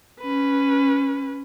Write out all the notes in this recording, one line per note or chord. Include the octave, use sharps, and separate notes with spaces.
C#4 B4